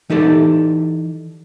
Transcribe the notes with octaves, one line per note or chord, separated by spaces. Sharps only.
E3 D#4 G4 A4 D5